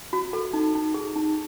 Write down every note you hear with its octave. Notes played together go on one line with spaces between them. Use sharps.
F#4
A4
D#4
D#4
G#4
D#4